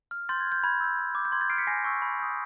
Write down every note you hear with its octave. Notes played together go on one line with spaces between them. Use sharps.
F6
C6 G6 A6
G#6
F6
G6
B5 G#6
E6 G6
B5
D6 G6
G6
C6 G#6
G6 A6
F6 C7 D7
B6 C#7
G#5 A#6 C7
C#6 E6 G6
B5
D#6 G6